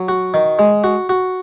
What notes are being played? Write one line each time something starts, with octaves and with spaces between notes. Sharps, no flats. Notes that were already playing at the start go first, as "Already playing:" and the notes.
Already playing: F#3
F#4
D#3
G#3
F#4
F#4